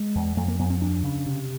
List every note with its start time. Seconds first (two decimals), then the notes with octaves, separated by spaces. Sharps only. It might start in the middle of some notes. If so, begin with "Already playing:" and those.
Already playing: G#3
0.15 E2
0.37 F2 A3
0.48 A#3
0.59 F2 B3
0.70 C4
0.81 D#2 D4
1.03 C#3
1.26 C3